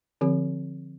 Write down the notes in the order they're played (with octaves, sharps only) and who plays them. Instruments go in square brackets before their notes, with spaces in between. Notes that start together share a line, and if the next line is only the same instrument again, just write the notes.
[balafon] D3 F3 C4 G4